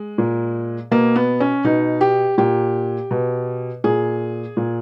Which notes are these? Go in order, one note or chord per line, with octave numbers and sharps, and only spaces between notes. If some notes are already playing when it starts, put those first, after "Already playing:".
Already playing: G#3
A#2
B2 A#3
B3
C#4
B2 D#4
G4
A#2 G4
B2
A#2 G#4
A#2